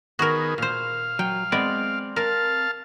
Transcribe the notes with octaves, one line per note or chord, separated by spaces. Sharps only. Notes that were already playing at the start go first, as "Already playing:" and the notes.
D#3 B3 F#4 G#4 A#4
A#2 C5 F5
F#3 G5
G#3 B3 C4 D5
A#4 F5 A5